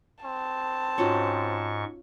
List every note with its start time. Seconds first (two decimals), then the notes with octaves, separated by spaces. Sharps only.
0.24 C4 A5
0.98 G#2 C#4 F4 F#4 C#6